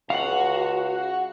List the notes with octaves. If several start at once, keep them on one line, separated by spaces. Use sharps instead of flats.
C#2 F#4 F5 F#5